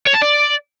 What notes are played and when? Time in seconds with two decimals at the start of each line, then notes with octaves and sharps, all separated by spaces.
0.07 C#5
0.15 A5
0.22 D5